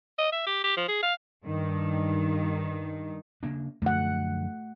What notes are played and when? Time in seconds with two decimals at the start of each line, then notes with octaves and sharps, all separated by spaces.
0.18 D#5
0.32 E5
0.47 G4
0.64 G4
0.77 F3
0.88 G#4
1.03 F5
1.43 G2 D#3
3.43 C#3 A#3 D4
3.82 F#2 D3 F3 A3 F#5